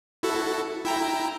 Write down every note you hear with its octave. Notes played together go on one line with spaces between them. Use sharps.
E4 F#4 A4
E4 G5 A#5